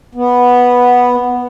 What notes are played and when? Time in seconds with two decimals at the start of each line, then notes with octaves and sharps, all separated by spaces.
0.15 B3